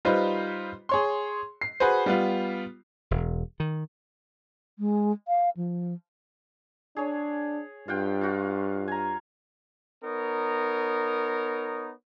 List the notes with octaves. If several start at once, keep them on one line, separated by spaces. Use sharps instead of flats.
G3 D#4 F4 B4 C5
G#4 C#5 C6
C7
F#4 G#4 B4 C5
G3 B3 F4
E1
D#3
G#3
F5
F3
D4 G#4 C#5
G2 F4 F#5 G5
F4 F#4
G#5 A#5
B3 D#4 A#4 C#5